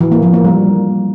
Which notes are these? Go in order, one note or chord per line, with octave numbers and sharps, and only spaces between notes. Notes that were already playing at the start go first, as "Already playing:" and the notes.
E3
A#3
F3
A#3
G3